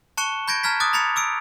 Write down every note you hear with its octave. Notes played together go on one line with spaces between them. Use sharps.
A5 C#6 F#6 C#7 E7 G7
B5 G6 G#6 A#6 D7
A5 A#5 F6 G#6 B6
D6 D#6 F#6 A6
A#5 B5 G#6 A6 C#7 F7
D6 E6 D7